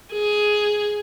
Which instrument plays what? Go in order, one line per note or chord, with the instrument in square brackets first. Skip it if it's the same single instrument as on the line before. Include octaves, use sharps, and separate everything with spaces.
[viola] G#4